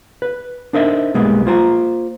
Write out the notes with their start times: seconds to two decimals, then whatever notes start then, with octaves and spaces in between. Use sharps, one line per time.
0.22 B4
0.73 D4 D#4 A#4 C5 D#5 E5
1.14 B1 G3 G#3 A#3 B3
1.46 A#3 F4 C5 G5 A#5